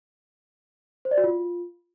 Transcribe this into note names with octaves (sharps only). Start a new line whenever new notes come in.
C5
D5
F#4
F4